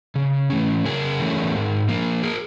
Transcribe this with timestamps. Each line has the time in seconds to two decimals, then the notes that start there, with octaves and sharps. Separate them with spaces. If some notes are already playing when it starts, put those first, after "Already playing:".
0.15 C#3
0.50 E3 A3 C#4
0.85 C#3 G#4 A#4
1.19 E3 A3 C#4
1.54 G#2
1.89 F3 A#3
2.23 G#4 A#4